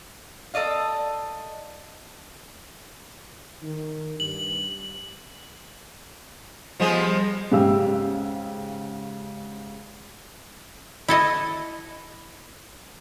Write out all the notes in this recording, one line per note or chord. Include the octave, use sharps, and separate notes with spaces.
A4 D5 D#5 F5
D#3
G2 F#7
F3 G3 G#3 B3
G#2 C#3 G4 F5 E6
E4 A4 D#5